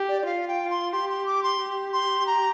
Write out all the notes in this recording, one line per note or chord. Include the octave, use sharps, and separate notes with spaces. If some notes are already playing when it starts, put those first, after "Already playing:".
Already playing: G4
D5
D5
F4 F5
G5
C6
G4 C6
C6
D6
C6
G4
C6
A#5